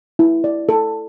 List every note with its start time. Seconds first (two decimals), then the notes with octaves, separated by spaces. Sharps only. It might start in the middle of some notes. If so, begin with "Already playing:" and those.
0.19 E4
0.44 D5
0.69 A4